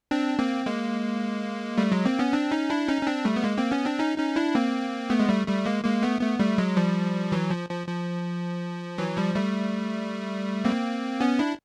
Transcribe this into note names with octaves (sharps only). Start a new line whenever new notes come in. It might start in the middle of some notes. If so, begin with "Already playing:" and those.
C4 D4
A#3 C4
G#3 A#3
G3 A3
F#3 G#3
A#3 C4
B3 C#4
C4 D4
C#4 D#4
D4 E4
C#4 D#4
C#4
C4 D4
G3 A3
B3
G#3 A#3
A#3 C4
B3 C#4
C4 D4
C#4 D#4
C#4 D#4
D4 E4
A#3 C4
A3 B3
G#3
G3 A3
G3 A3
G#3 A#3
G#3 A#3
A3 B3
A3 B3
G3 A3
F#3 G#3
F3 G3
E3 F#3
F3
F3
F3
E3 F#3
F3 G3
G3 A3
A#3 C4
B3 C#4
D4 E4